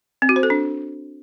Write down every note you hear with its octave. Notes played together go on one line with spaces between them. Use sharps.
C4
F#4
C5
A4
D4